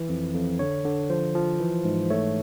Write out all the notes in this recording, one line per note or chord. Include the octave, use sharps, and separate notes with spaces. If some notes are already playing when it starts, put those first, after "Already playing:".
Already playing: E3
F2
F2
D3 C#5
D3
F3 C5
F3
E3
G#2
A3 C#5